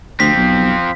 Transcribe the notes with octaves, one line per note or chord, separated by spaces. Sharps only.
D2 F3 C4 B6
B1